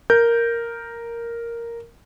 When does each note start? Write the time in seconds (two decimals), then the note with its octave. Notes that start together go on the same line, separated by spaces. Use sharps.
0.10 A#4 G6